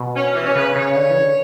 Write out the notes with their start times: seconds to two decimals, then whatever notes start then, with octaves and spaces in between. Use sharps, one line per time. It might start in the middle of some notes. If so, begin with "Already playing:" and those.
Already playing: B2
0.15 C#4
0.25 C#4
0.34 E3
0.45 C#4
0.55 C#3 B4
0.76 C#3 C#5
0.96 D3
1.10 E3
1.18 C#3
1.24 D3